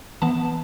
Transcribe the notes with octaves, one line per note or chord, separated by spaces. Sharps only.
E3 B3 A5